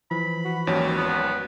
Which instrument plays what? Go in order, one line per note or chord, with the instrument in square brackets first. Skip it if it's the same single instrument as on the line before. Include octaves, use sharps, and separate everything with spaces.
[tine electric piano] E3 F3 [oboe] B5
[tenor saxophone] F#4
[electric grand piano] G#1 D#2 C#4 [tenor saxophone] F#3
[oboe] B3